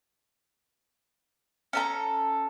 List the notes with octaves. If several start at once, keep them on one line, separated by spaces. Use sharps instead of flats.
C#4 A4 A#5